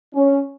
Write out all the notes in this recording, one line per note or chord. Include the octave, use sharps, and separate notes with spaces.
C#4